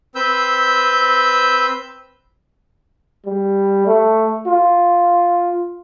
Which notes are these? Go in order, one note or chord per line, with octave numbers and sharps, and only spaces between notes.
C4 B4 E6 G6
G3
A3
F4